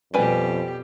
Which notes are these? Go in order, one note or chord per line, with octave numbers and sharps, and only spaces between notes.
F2 B2 G3 G4 B4 G#5